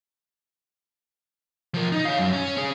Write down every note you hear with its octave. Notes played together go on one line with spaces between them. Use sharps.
F3 A#4
D#4
C#5 F5
F#2
C#4
C#4 G#4